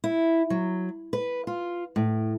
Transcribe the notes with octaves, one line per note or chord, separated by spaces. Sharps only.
E4
F#3
B4
F4
A2